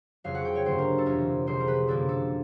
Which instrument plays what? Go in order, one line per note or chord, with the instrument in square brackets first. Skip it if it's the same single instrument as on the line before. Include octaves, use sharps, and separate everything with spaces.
[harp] F2 C#3 F#3 F5
F#5
G5
C#5
G2 D3 F#3 A#3 C5
A#4
A4
F2 C3 E3 A#4
C#2 C3 F3 C5
A#4
B4
F#2 D3 F3 A#3 A4
A4